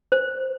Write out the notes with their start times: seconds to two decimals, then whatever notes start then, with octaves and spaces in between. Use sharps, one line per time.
0.12 C5